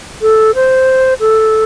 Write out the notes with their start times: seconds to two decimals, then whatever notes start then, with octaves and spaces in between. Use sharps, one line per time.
0.22 A4
0.55 C5
1.20 A4